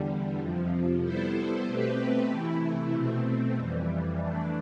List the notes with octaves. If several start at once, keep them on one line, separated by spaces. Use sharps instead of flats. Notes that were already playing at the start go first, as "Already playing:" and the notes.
Already playing: E2 D3 G3
F2 C3 F3
G3 B3 E4 A4 C5
B2 A3 C4 G4 B4
C3 E3 A3 E4
B2 A3 C4
F2 E3 G3
E3 A3 D4